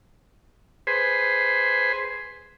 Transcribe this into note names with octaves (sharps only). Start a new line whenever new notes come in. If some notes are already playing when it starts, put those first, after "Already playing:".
G#4 B4 C5